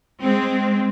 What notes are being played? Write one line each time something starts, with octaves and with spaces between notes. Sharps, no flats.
G#3 C4